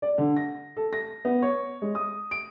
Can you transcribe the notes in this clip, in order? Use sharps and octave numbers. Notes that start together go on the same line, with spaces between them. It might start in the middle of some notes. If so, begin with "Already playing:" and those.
D5
D3
A#6
A4
A#6
B3
C#5
G#3
D#6
D7